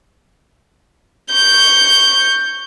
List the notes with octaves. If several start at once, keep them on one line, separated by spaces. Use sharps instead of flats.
C#6 G6